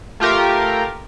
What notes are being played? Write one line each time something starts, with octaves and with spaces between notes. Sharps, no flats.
A3 F4 G4 A#4